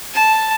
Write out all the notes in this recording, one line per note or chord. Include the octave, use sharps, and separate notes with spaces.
A5